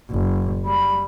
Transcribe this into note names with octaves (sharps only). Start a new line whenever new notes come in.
F#1
G3 B5